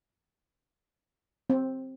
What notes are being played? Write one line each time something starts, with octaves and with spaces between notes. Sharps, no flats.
C4